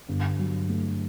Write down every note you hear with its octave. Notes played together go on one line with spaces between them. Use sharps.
G1
F#3
A3